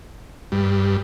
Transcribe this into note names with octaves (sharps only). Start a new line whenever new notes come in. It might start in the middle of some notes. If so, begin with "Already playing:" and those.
G2